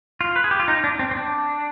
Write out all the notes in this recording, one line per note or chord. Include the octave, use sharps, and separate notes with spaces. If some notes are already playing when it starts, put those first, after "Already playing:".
F4
B4
G#4
G4
F4
D#4
D4
C4
C4
D4